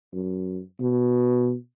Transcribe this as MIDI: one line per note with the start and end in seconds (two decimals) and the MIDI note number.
0.13 0.60 42
0.80 1.54 47